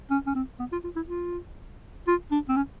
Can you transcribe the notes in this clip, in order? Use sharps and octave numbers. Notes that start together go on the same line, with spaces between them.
C#4
C#4
C4
B3
F4
F4
E4
F4
F4
D4
C4
C#4